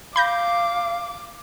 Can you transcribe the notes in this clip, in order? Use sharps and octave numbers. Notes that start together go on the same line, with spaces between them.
F5 B5 D6 G6 A#6